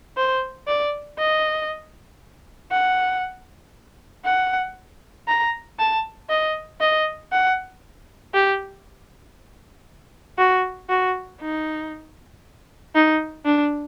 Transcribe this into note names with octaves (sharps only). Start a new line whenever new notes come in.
C5
D5
D#5
F#5
F#5
A#5
A5
D#5
D#5
F#5
G4
F#4
F#4
D#4
D#4
D4